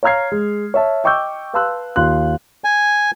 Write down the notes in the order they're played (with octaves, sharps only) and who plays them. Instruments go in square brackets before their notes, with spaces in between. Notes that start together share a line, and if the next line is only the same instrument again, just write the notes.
[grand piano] C#5 F5 A#5 F6 G#6 C7
G#3
C#5 E5 A5
D#5 G5 C#6 D6 E6 G6
B4 F5 A5 C6 E6 F#6
D#2 F4 C6 F#6
[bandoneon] G#5